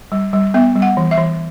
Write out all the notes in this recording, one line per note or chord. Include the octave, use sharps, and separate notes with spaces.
G3
G3
B3 E5
G3
F#5
E3
E5
E3